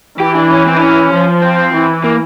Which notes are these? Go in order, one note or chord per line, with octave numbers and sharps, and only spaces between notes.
E3 G4
D4
C#4
C4
D4
C#4
F3
C4
E3
A#3